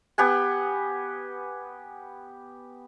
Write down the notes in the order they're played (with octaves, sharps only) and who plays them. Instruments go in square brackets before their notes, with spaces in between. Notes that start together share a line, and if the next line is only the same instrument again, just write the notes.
[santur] B3 G4 F#5 G#5